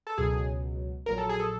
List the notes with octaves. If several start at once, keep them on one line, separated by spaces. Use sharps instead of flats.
A4
C#2 B2 F#3 G#4
A#1 A#2 F#3 A#4
A4
G#4
A4